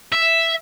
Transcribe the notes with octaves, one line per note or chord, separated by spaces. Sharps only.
E5